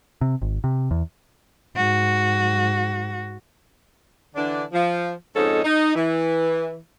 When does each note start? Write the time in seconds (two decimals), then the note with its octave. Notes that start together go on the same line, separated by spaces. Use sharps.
0.21 C3
0.42 G#1
0.64 C3
0.91 E2
1.76 G#2 F#4
4.35 D3 E3 D4
4.72 F3
5.35 F2 G#2 C#4 D#4 A4
5.64 D#4
5.95 E3